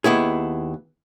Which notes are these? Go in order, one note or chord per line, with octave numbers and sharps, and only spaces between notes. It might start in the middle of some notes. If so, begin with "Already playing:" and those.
D#2 B3 E4 G#4